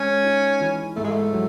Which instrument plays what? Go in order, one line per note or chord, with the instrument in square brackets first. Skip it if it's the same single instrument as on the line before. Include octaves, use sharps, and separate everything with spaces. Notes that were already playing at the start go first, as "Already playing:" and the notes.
Already playing: [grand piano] G#3 [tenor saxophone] C#4
[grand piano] D#4
E3
[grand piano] G#2 [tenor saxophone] A3
[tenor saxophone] G#3
A3
[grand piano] F#3